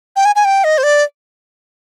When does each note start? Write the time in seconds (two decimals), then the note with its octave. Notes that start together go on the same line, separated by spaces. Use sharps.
0.16 G5
0.25 G#5
0.35 G#5
0.45 G5
0.64 D#5
0.78 C5
0.83 D5